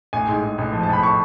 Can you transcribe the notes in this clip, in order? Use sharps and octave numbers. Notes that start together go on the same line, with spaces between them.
A1 G#5
G#2
G#2
A1
F3
A5
A1 B5
C#6